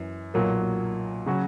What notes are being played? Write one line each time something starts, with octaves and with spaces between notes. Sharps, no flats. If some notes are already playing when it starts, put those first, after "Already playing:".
Already playing: F#2 E3
B1 A#2 F#3 A#3
C#3 F#3 C#4 F#4